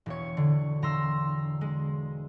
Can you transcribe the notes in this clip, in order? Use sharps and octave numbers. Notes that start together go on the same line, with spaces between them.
E1 C#5
D3
E1 A#5 C6 E6
G#3